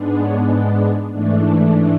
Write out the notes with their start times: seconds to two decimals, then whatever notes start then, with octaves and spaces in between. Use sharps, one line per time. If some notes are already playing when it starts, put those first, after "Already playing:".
Already playing: G#2 G#3 B3 D4
0.22 C#5
1.12 G#2 E3 A3 D4